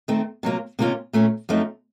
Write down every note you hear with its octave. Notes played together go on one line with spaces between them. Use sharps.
D#3 A3 C4
C3 F#3 A#3 F4
C3 D#3 A#3 C#4 F4
A#2 A3 C#4
F#2 F3 A3 C4 D#4